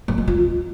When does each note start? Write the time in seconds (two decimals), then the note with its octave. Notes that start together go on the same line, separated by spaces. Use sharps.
0.08 G3
0.18 G#3
0.28 F4